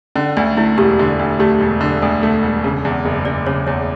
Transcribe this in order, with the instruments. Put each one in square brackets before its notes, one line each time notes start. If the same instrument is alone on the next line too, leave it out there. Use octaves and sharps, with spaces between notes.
[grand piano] D3 [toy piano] C#4
[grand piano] D2 [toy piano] D4
[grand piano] A3 [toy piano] E4
[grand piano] E1 [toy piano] G4
[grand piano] D3
D2
[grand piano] A3 [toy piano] G4
[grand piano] E1
D3
[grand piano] D2 [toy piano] A4
[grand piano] A3
E1
C#3
E2
F#1
[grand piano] F#1 [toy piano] D5
[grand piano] C#3 [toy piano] C#5
[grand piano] E2 [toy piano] C#5